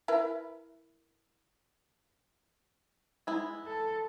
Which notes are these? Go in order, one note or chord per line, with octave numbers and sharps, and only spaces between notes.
E4 A#4 B4
G#3 B3 E4
A4